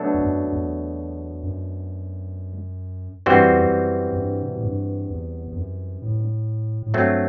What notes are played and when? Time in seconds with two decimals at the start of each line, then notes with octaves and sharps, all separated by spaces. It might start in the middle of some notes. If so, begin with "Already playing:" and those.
Already playing: B2 F#3 A3 D4 A4
0.14 E2
0.21 F#2
0.47 F#2
0.51 E2
1.43 F#2
3.26 G2 E3 G3 C4 F#4 C5
3.38 F#2
3.49 E2
3.60 F#2
4.12 F#2
4.19 G2
4.42 C3
4.50 B2
4.57 A2
4.64 G2
5.10 E2
5.48 E2
5.56 F#2
6.02 A2
6.82 A2
6.94 G2 F#3 A3 C4